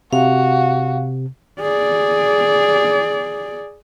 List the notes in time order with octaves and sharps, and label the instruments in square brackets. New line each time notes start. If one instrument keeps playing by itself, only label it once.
[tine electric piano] C3 [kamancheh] F#4 [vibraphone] F5
[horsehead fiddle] G#4 D5